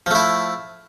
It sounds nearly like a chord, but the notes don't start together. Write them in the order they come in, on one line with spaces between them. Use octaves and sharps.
F3 A3 E4